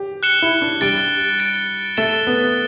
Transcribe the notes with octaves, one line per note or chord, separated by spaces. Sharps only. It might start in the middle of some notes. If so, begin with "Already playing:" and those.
Already playing: G4
F#6 C#7 E7 G7
E4
D4
G3 A6 D7 G7
A6 D7 G7
A3 A6 E7 G7
B3